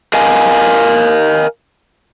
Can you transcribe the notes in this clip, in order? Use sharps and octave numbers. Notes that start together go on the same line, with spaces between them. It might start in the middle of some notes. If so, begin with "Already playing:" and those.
A#4 D#5 F5 G#5